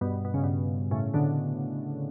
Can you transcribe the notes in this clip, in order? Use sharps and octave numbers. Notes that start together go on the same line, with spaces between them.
G2 B2
B2
C#3
G2 B2
A2 C#3
B2 D3